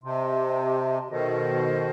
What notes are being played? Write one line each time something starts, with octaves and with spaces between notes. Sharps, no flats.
C3 G4 D#5 A5 C6
B2 D#3 A4 C5 D#5